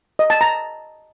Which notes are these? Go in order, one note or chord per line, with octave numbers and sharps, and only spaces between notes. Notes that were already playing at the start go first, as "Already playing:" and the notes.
D#5
A5
A#5